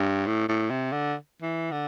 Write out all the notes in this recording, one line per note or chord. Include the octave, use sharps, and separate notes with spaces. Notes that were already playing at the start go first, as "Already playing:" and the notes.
Already playing: G2
A2
A2
C3
D3
E3
D3